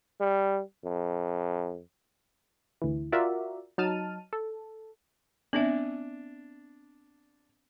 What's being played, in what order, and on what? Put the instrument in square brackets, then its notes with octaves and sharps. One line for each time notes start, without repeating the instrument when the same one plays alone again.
[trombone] G3
F2
[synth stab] D2 E3
F4 F#4 A#4 D5 E5
F#3 D#4 A5 F6 D#7
A4
[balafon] B3 C4 E5 [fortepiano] D4